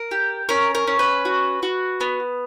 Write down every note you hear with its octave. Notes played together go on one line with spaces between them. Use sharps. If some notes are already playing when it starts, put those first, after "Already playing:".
Already playing: A#4
G4
C#4 A#4
A#4
C#4
B4
F#4
F#4
B3